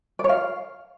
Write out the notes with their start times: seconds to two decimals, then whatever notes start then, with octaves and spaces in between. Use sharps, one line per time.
0.19 D5
0.24 C#5
0.29 F5